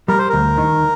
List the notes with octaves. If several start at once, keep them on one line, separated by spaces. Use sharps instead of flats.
G3 A#4
C5
D2 A#4
D#3